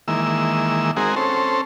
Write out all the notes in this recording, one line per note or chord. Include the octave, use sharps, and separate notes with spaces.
D#3 E3 G#3 A#3 E6
G#3 C4 D#4 F#4 G#4 A#4
C4 C#4 A4 C5